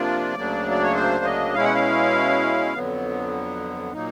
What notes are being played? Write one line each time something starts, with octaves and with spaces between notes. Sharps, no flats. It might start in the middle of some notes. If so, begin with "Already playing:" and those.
Already playing: C3 F3 A#3 D4 F4 D5
D2 C#3 F#3 A#3 D4
D5
C#5
C5
D#5
B2 G#3 C#4 E4 F5
F#5
F5
F2 D3 F#3 B3
A#2 F#3 A#3 D#4